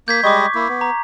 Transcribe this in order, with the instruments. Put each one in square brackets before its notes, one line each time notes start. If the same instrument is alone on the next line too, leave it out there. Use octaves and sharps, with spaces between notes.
[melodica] A#3 [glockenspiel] G6 G#6 B6
[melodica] G3 G#3 D#5 [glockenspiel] C#6 D6
[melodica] A#3 E4
B3
[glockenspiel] A#5